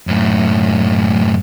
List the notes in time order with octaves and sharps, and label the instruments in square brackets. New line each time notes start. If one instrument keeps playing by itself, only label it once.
[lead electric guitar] F#2 A2